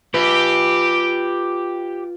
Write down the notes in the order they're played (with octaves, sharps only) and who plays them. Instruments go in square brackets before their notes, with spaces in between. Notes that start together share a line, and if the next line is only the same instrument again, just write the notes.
[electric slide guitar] F4 B4 [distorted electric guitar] G4